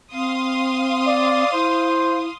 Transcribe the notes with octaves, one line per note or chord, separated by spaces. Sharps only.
C4 F5 C6 D#6
D5
E4 C5